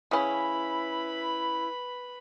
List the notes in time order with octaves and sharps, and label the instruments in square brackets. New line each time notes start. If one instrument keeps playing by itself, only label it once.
[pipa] C#3 C#4 [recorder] E4 [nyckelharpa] B4 B5